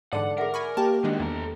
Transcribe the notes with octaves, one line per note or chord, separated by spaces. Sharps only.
G#2 D3 E3 D5 F#5 A5
G#4 A#4 E5 F#5
G#5 B5 C#6
A#3 G4 A5
C3 D#3 G#3 D4 F#4
E2 A4 A#5